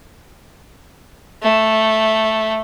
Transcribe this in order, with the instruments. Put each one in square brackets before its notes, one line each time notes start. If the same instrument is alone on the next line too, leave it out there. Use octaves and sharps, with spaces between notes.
[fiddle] A3